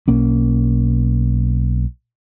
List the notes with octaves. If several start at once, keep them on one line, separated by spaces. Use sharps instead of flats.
B1 A#3 C#4